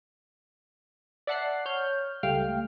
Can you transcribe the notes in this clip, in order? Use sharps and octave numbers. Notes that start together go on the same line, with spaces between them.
D5 E5 F#5 A5 F#6 C7
C#5 F6 G6
C#2 G3 A3 F5 G5 F6